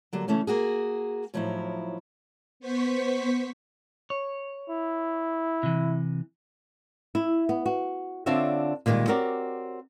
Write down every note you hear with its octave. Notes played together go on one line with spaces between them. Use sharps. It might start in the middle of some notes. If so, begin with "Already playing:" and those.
D3 F#3 G3 A#3
C#3 E3 A3 C#4
A#3 F#4 G#4
A2 F3 F#3 D#4 E4
B3 C5 C#6 B6
C#5
E4
C3 E3
E4
B3
F#4
D3 C4 D4 F4 C#5 E5
A#2 D3 D#3 G3 G#3
C4 F#4 G4 A#4 C#5 D5